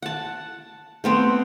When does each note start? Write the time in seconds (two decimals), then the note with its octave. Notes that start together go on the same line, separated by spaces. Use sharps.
0.02 F#5 A5
1.04 A3 B3 C4